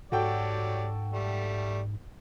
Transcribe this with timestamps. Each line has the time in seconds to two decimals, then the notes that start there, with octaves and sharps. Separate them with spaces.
0.12 G#2 F#3 F#4 G4 A4 D5 G5
1.13 G3 A3